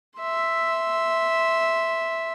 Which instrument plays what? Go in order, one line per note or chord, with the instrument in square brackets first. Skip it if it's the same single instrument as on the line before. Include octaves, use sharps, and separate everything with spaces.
[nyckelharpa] E5 C6